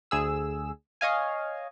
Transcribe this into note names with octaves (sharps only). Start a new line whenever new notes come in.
D2 G#4 E6
C#5 D#5 F5 G#5